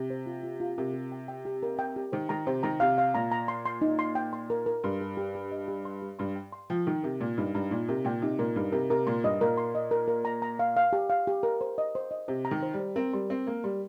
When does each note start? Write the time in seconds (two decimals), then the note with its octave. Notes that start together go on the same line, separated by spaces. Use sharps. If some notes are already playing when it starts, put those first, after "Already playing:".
Already playing: C3
0.10 C5
0.26 F4
0.43 F4
0.60 F4
0.78 C3 A#4
0.94 G4
1.12 G5
1.28 G5
1.45 G4
1.63 A#4
1.79 G5
1.96 G4
2.12 D#3 C5
2.29 D#3 A#5
2.47 C3 C5
2.63 D#3 A#5
2.80 C3 F5
2.98 F5
3.14 A#2 A#5
3.32 A#5
3.48 C6
3.66 C6
3.82 D#4
3.99 C6
4.15 G5
4.33 C6
4.50 A#4
4.66 A#4
4.84 G2 C6
5.01 G4
5.17 G4
5.35 G4
5.52 D#5
5.68 G4
5.85 C6
6.02 G4
6.19 G2 C6
6.36 G5
6.53 C6
6.70 F3 G5
6.87 D#3 D#4
7.03 C3 A#4
7.20 A#2 A#4
7.38 G2 D#4
7.55 G2 A#5
7.71 A#2 D#4
7.89 C3 A#4
8.05 A#2 G5
8.22 C3 D#4
8.39 A#2 A#4
8.56 G2 D#4
8.72 C3 A#4
8.90 C3 A#4
9.07 A#2 C6
9.24 G2 D#5
9.41 A#2 A#4
9.57 C6
9.75 D#5
9.91 A#4
10.08 A#4
10.25 A#5
10.42 A#5
10.59 F5
10.77 F5
10.93 G4
11.10 F5
11.27 G4
11.43 A#4
11.61 C5
11.78 D#5
11.95 C5
12.11 D#5
12.28 C3 C5
12.45 A#5
12.51 D#3
12.63 C5
12.74 G3
12.80 C5
12.96 C4 A#4
13.13 G3 C6
13.30 C4 A#4
13.47 A#3 A#4
13.64 G3 C6